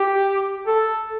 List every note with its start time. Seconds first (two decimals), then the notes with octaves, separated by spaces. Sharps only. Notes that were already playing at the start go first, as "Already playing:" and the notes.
Already playing: G4
0.67 A4